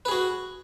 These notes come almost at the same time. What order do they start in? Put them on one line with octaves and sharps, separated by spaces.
B4 G#4 F#4